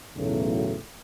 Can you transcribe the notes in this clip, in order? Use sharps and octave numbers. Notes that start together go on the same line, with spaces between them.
B1 E2 A2 C#3 F#3 A3